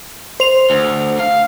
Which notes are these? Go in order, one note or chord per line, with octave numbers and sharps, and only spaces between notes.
C5 F7
D2
F5